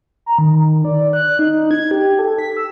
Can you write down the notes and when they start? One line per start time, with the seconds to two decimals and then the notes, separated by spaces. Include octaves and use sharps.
0.26 A#5
0.38 D#3
0.85 D5
1.13 F#6
1.39 D#4
1.71 G#6
1.91 G4
2.19 A4
2.38 B6
2.57 E6